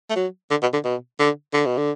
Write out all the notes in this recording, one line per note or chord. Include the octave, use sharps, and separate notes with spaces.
A3
F#3
D3
B2
D3
B2
D3
D3
B2
D3